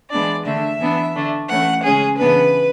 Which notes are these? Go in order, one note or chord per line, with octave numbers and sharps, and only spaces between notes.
E3 G#3 B3 D4 D5
D3 A3 D4 E5
E3 B3 D4
D3 A3 D4
E3 A3 C#4 F#5
C#3 G#3 C#4 G#4
C#3 E3 B3 D4 B4